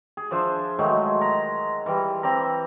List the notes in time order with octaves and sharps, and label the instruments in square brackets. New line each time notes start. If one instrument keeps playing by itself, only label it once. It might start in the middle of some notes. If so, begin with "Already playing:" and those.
[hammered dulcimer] G#4
F3 D4 C5 E5
D#3 F#3 G#3 A3
A#5
E3 G3
C4 D5 A#5